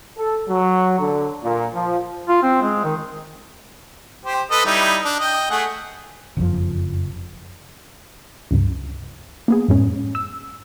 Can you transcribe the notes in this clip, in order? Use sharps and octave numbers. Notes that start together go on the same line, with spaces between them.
A4
F#3
D3
A#2
F3
F4
C4
G#3
D#3
G4 C5
A4 B4 D#5
G3 D#4 E4
D4
D#5 G5
A3 G#4 F#5
F#1 F2 A#2 F3
C#2 G2
A#3 B3 G#4
F#2 A2 G#3 C#4
E6